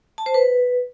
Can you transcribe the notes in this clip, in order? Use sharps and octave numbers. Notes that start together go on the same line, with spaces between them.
A5
C5
B4